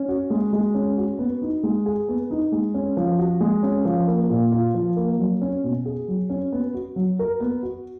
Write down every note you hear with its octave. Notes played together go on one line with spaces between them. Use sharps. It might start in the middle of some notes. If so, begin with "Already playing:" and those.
Already playing: C#4
F#4
G#3
G#3
C#4
F#4
B3
D#4
G#3
G#4
B3
D#4
G#3
C#4
F3
F#4
G#3
C#4
F3
A#3
A#2
F4
F3
A#3
F#3
C#4
B2
G#4
F#3
C#4
B3
F#4
F#3
A#4
B3
F#4